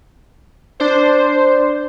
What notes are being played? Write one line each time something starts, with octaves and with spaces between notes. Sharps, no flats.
D4 C5